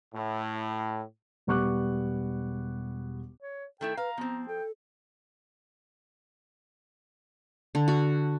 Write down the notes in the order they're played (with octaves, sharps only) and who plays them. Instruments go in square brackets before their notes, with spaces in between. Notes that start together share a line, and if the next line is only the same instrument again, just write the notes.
[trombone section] A2
[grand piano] E1 G3 B3 C#6 D6 F#6
[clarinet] C#5
[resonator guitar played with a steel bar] D#3 A3 E4 [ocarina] A4 [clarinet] G5
[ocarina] B4 [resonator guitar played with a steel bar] F5 [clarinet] A#5
[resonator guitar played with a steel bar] F3 C4 [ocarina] B3
[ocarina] A4 [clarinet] G5
[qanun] D3
F#4